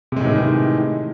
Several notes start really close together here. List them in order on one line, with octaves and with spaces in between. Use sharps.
C3 G#3 A2 E3 D#3